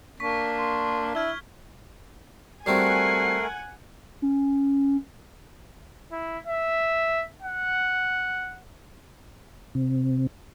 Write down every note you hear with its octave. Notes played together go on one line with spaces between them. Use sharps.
A#3 D4 C#6 B6
C6
E4 F6 G#6 G7
G3 A3 C4 F#4 A#4 F#5 G#5 C7
C#4
E4
E5
F#5
C3